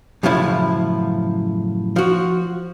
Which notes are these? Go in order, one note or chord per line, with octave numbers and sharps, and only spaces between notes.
F#2 A2 C#3 F3 E4
F3 F#4